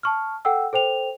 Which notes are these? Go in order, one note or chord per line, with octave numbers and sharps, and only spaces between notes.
A5 C#6 F6
A4 F#5 G5 E6
A4 C5 G5 F7